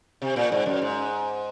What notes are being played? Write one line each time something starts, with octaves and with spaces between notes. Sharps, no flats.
C3
A#2
G#2
F#2
G#2